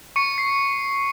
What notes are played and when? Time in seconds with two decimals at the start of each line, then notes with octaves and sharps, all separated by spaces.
0.16 C#6 C#7
0.38 C7